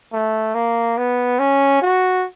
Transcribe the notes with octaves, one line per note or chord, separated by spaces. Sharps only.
A3
A#3
B3
C#4
F#4